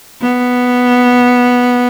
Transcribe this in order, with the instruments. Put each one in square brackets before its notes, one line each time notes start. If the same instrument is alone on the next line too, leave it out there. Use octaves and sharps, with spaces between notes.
[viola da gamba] B3